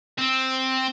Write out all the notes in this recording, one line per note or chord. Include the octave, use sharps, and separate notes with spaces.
C4